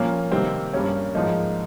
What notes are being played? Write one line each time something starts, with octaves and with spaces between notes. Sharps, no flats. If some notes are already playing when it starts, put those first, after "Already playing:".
Already playing: A#2 F3 A#3 C#4
C3 D#3 G3 A#3 C4
G2 G3 A#3 C#4
G#2 F3 A#3 D#4